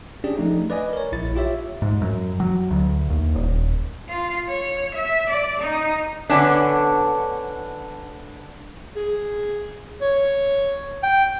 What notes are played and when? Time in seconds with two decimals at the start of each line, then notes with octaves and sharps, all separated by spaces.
0.24 C#4 D4 G4 G#4 D5
0.37 F3 A3 D#4
0.70 B4 D5 D#5 G#5
0.93 A#4 C#5
1.12 A#1 E4 A6
1.35 F4 G4 C#5 E5
1.82 G#2
2.02 F#2
2.40 F#3
2.71 D2
3.10 D#2
3.35 D#1
4.08 F4
4.48 C#5
4.95 E5
5.30 D5
5.60 D#4
6.29 D3 B3 C#4 D4
8.96 G#4
10.01 C#5
11.03 G5